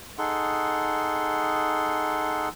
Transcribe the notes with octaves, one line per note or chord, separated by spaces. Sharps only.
D#4 G#4 A4 F#5 C6